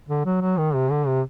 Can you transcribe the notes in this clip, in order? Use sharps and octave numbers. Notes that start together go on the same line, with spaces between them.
D3
F#3
F#3
D#3
C3
D3
C3